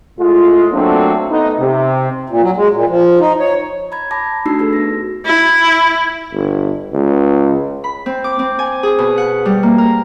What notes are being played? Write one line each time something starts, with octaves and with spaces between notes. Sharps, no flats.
A2 G#3 F4
F#3 A3 A#3 C4 D4
A3 B3 D#4
C3
A#2
F#3
G#3
A#2
F3
D#4
C#5
A#5 B5 G#6
A5 B5 D6 A#6
A3 D4 D#4 F#4 E6 C7
F#4 G#4 A4 B4
B3 A#6
E4
G1
C#2
B5
C4
D6
C4
G#5
G#4
B2
F#5
G3
A#3
A#4